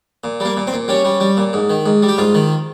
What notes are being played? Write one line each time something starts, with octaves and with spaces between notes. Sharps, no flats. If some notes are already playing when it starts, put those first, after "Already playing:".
A#2
G3 A#3
A#2
C4
A#2
G3 C#4
G3
G3
A#2
G#2
D#3
G#2
G3
G4
G#2 F4
D#3